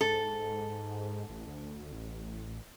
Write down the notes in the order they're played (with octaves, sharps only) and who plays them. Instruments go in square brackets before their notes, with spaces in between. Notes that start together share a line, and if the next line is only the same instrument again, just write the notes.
[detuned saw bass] G#2 [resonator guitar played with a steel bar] A4
[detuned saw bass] A1
D2
A1